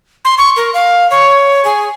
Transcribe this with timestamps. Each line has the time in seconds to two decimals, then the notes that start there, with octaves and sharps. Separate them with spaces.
0.25 C6
0.38 C#6
0.56 A#4
0.74 F5
1.11 C#5
1.65 G#4